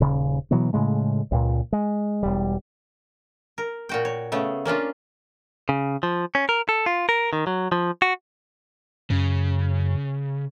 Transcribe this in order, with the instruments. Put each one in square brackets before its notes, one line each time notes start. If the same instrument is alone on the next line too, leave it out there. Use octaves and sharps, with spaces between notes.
[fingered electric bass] D#1 C#3
B2 E3 F#3 B3
A2 C#3 G#3 A3
C#2 A#2
G#3
E1 G3
[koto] A#4
A#2 F#4 G5
C#5
C#3 A3 B3
A#3 C#4 D4 F4
[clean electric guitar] C#3
F3
C#4
A#4
A4
F4
A#4
D#3
F#3
F3
F#4
[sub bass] F#2 [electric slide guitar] C#3